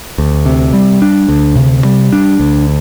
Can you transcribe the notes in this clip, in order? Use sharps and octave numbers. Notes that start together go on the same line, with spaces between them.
D2
C3
G3
D4
D2
C3
G3
D4
D2